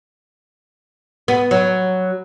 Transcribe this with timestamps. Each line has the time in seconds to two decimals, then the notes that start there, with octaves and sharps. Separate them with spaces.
1.28 B3
1.51 F#3